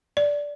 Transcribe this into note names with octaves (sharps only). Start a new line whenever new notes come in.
D5